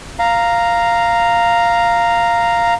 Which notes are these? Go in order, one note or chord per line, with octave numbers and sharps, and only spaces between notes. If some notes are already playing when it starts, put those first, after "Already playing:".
F5 A#5